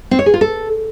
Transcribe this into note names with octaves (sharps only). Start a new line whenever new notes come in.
C4
C#5
G#4
F4
A4